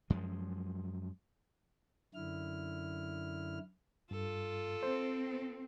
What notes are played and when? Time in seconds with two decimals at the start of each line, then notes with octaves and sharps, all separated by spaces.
0.10 F#2 F3 G#3
2.15 F#2 D3 E4 F6
4.11 G2 F4 A4
4.83 C4 C5